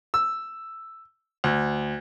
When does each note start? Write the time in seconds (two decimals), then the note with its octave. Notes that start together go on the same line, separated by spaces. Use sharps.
0.14 E6
1.44 D2